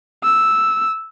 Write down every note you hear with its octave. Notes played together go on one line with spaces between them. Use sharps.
E6